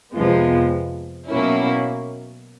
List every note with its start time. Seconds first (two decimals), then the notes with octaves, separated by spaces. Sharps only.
0.13 F2 C3 F3 G#3 B3
1.29 B2 F#3 A#3 C#4 E4